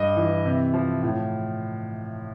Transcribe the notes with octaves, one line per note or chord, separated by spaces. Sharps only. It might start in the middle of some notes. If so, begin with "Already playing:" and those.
Already playing: G2 D#5
E3
C3
F3
A2